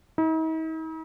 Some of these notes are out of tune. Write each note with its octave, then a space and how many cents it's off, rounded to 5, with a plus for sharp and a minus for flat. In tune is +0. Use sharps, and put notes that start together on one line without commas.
D#4 +45